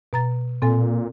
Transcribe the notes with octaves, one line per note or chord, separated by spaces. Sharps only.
B2 A#5 A6
A#2 C4 A4 G#5